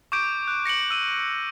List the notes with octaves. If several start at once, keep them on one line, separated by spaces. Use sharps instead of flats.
C#6 D6 G6 D7
F#6
A#6 C#7 D7 F#7
E6 D#7